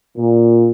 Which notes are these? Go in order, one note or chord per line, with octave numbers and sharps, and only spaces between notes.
A#2